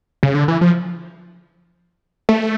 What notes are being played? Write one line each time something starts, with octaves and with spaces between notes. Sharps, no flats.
C#3
D3
E3
F3
A3